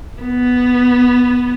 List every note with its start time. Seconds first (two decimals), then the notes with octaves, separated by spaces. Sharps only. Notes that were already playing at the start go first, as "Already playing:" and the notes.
0.22 B3